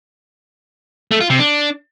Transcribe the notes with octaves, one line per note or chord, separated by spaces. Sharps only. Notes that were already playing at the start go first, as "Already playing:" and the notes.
A3
F4
C3
D4